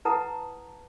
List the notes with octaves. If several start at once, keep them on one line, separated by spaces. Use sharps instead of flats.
E4 B4 F#5 A5 A#5 D#6